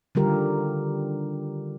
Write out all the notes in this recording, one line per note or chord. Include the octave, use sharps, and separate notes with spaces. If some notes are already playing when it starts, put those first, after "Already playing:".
D3 D#3 G3 F4 G4 A#4